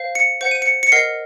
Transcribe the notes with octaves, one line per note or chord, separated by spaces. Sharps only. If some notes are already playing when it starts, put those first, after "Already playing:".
Already playing: C5 F5
C#7
C5 F#5 C#7
D#7
C#7
C#7
A#4 D#5 F#5 C7